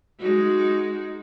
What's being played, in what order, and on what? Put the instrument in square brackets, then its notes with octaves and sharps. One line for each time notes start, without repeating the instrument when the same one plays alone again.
[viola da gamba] G#3 D#4 F#4